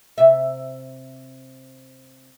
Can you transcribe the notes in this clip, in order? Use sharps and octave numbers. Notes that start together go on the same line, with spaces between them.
C3 E5